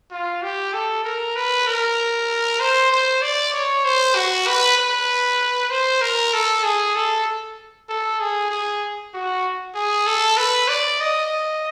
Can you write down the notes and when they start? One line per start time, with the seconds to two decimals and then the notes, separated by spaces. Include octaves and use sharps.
0.11 F4
0.42 G4
0.73 A4
1.04 A#4
1.36 B4
1.67 A#4
2.60 C5
2.92 C5
3.22 D5
3.54 C#5
3.85 C5
4.15 F#4
4.47 B4
4.78 B4
5.70 C5
6.02 A#4
6.34 A4
6.64 G#4
6.95 A4
7.89 A4
8.20 G#4
8.51 G#4
9.14 F#4
9.75 G#4
10.07 A4
10.37 B4
10.68 D5
11.00 D#5